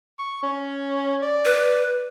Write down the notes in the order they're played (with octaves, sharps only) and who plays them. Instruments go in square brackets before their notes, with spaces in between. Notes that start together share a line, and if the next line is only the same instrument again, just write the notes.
[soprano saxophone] C#6
C#4
D5
[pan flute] B4